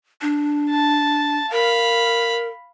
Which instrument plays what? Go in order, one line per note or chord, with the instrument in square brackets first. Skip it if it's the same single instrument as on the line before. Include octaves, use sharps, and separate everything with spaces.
[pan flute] D4
[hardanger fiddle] A5
[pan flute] A#4 [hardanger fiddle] F5 B5